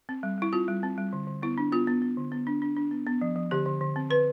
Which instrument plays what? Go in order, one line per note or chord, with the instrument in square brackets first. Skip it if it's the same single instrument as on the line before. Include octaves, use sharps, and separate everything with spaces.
[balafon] C4
G3
G3 E4
C4 F4
G3
C4
G3
D3
D3
B3 E4
D4
B3 F4
B3
B3
D3
B3
D4
D4
D4
B3
B3
F3
F3
D3 G4
D3
D3
C4
D3 B4